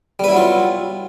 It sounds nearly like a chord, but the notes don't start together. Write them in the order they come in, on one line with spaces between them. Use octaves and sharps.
G3 B4 E4 F#3 F4